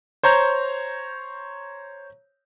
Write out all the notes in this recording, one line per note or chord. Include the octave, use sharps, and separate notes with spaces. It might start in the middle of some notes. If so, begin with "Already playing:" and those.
C5 C#5 A#5 G6